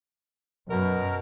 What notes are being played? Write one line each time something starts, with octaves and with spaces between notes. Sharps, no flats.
F#2 B2 A#4